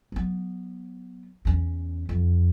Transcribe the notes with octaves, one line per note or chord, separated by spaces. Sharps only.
F#3 B3
E2 C#4
F2